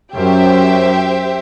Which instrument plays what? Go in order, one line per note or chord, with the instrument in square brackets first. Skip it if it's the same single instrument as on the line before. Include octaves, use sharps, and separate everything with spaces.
[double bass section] F#2 [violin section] G4 C5 E5 G5